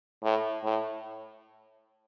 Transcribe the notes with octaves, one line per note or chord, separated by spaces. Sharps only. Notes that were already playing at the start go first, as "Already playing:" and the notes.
A2
A2